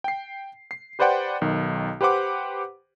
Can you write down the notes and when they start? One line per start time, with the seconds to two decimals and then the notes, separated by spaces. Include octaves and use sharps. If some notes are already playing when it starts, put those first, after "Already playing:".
0.04 G5 C7
0.71 C7
0.99 G4 B4 C5 D5 F#5 G5
1.41 B1 D#3
2.01 G4 B4 C5 F#5 D6